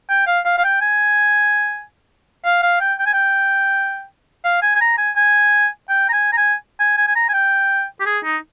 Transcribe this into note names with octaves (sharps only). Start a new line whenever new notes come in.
G5
F5
F5
F5
G5
G#5
F5
F5
G5
G5
G#5
G5
F5
G#5
G#5
A#5
G#5
G#5
G5
A#5
G#5
A#5
G#5
G#5
G#5
G#5
A#5
G#5
G5
G4
G#4
D#4